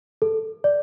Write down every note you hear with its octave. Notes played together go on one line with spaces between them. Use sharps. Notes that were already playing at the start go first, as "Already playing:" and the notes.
A4
D5